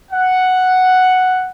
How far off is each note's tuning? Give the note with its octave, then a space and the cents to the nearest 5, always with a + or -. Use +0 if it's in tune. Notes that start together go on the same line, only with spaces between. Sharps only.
F#5 +0